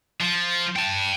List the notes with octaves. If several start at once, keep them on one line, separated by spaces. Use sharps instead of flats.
F3
G5 A5